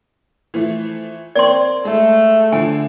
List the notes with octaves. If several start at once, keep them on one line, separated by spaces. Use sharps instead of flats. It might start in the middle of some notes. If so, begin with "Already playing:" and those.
E3 F3 A3
A#3 C4 D5 C6
G#3 A3
D3 F3 G#5